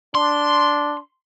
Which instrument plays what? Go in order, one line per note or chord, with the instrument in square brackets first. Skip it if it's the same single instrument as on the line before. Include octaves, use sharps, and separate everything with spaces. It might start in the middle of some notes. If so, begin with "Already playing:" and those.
[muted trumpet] D4 [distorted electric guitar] C6